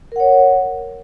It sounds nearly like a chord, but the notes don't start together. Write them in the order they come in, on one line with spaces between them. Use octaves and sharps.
A#4 F#5 C#5